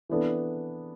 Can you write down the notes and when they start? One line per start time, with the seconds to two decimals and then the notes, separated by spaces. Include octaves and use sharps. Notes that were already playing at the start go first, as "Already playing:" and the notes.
0.09 E3 B3 D4 A4